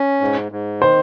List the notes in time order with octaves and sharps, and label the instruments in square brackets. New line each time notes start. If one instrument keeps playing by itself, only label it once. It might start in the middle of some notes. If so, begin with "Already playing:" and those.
Already playing: [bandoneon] C#4
G#2
G#2
[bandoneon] D#3 [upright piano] C5